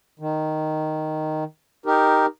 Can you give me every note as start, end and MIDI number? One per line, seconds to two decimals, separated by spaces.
0.19 1.44 51
1.86 2.26 63
1.86 2.26 67
1.86 2.26 70